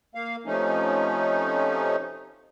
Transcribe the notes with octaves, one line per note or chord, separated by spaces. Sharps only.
A#3 F5
C3 F3 A3 C#4 D#4